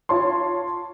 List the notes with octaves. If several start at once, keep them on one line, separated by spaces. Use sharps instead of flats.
F4 C#5 A5 C6